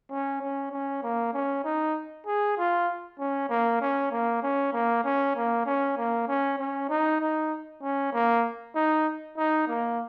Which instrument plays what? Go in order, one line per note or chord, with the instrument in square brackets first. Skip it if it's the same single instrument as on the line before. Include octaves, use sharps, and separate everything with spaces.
[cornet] C#4
C#4
C#4
A#3
C#4
D#4
G#4
F4
C#4
A#3
C#4
A#3
C#4
A#3
C#4
A#3
C#4
A#3
C#4
C#4
D#4
D#4
C#4
A#3
D#4
D#4
A#3